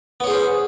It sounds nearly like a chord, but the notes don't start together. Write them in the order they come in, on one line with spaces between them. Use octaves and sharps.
B3 C#5 G#4 C5 C#4